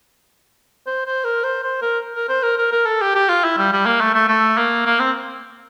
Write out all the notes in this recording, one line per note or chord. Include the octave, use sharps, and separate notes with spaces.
C5
C5
A#4
C5
C5
A#4
A#4
C5
A#4
A#4
A#4
A4
G4
G4
F4
E4
G3
G3
A#3
A3
A3
A3
A#3
A#3
C4